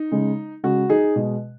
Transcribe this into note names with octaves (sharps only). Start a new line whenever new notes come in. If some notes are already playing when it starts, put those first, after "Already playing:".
Already playing: D#4
C#3 G#3
C#3 G#3 F#4
D#4 G#4
B2 G#3